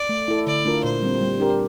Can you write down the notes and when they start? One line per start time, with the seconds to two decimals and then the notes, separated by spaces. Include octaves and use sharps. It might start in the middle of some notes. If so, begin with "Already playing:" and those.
Already playing: D5
0.09 A3
0.28 E4 A4
0.47 D3 D5
0.65 A3 D4 F4 A#4
0.84 A#2 C5
1.02 G3 C4
1.21 G3
1.40 D4 G4 A#4